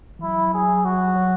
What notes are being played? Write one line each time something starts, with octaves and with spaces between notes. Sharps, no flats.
E3
F#3 E4
F#3 G#4
F#3 F#4
F#3